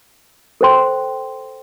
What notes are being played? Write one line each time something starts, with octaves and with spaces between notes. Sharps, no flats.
A4 C5 G5 C6